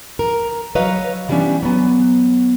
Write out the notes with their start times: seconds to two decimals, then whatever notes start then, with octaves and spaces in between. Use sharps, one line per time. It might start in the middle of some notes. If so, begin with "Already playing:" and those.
0.19 A#4
0.75 F#3 B4 C#5 D#5 F5
1.29 E3 G3 A3 B3 C#4 D4
1.63 F#3 B3